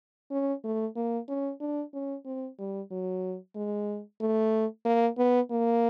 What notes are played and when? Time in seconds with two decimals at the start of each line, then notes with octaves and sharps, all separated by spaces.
0.31 C#4
0.64 A3
0.96 A#3
1.29 C#4
1.60 D4
1.94 C#4
2.26 C4
2.59 G3
2.91 F#3
3.56 G#3
4.21 A3
4.85 A#3
5.18 B3
5.51 A#3